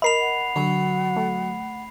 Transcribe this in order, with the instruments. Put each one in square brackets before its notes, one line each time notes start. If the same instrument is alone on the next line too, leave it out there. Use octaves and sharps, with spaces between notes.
[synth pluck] A#4 D#5 [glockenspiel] B5 C7 F7
[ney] F#5
[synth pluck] D3 [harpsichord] F#3
[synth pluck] A3